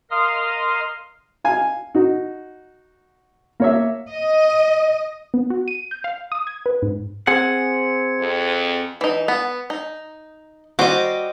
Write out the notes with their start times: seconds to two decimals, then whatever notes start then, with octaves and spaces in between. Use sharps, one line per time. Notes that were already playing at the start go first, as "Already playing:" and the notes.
0.11 A#4 D#5 F5 C6 D#6 F6
1.44 F5 G#5
1.95 D#4 F#4
3.60 A#3 C#5 E5
4.11 D#5
5.34 B3
5.50 F#4
5.68 D#7
5.91 G6
6.04 F5
6.32 D#6
6.47 G#6
6.66 B4
6.82 G#2
7.27 C4 G#4 F#5 C#7
8.19 F2
9.01 E3 D#4
9.28 B3
9.70 D#4
10.79 G3 F#4 C5 D#5 D6